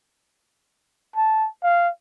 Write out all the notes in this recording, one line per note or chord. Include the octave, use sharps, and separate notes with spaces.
A5
F5